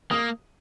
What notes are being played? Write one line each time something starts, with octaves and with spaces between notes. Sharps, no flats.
A#3 D#6